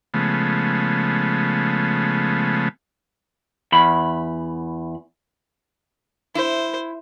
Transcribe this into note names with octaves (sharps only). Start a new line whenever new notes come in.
C#3 F3 G#3 A3 B3
E2 B5
E4 C5